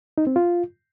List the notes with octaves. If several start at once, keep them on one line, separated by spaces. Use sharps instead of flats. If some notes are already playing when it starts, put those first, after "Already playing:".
D#4
C4
F4